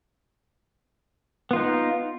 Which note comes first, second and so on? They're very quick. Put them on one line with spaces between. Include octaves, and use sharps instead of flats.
B3 F4 D#4